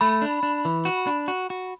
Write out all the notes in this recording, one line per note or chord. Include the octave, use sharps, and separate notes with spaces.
A3 B5
D4
D4
E3
F#4
D4
F#4
F#4